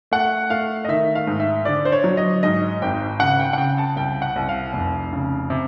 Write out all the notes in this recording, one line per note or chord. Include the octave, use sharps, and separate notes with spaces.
A3 F#5
A3 F5
D#5
D#3 E5
F5
G#2
E5
D3 D5
C5
C#5
F#3
D#5
G#2 D#5
G#1 G5
C#3 F#5
G5
F#5
C#3 G5
A5
C2 G5
F#5
C2
F5
F1
C#3
C3